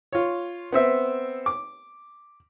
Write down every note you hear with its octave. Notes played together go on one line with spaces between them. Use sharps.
F4 C#5
B3 C4 E5
D6